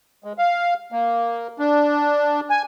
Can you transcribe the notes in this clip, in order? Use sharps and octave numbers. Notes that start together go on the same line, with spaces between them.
G#3
F5
A#3
D4
G#5